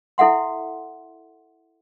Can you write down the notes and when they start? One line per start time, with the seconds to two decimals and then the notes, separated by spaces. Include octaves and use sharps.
0.18 E4 A4 E5 F#5 C6